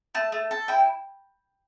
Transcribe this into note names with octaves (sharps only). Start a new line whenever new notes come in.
A3 A5
A3
A4
E4 G5